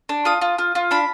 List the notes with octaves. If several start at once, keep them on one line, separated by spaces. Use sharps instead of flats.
D4
F4 D#6
F4
F4
F4
D4 B5